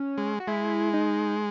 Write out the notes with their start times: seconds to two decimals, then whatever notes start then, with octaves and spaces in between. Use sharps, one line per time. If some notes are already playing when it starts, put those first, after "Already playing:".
Already playing: C#4
0.18 G#3
0.40 F#4
0.48 G#3 E4
0.94 D#4